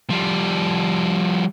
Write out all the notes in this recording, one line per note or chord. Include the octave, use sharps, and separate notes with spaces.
F3 G3